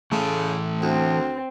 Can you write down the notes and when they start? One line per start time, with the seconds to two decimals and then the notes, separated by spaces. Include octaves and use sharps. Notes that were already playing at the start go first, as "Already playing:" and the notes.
0.12 C#3 E3 A3 A4
0.82 D2 C4